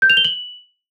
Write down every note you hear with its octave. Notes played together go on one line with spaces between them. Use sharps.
G6
F7
G7
F#7